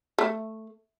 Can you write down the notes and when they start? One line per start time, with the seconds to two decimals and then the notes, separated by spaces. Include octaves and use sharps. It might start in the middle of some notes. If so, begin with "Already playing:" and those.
0.18 A3